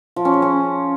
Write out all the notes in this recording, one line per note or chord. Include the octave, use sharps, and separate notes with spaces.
F3
C#4
G#4
C#4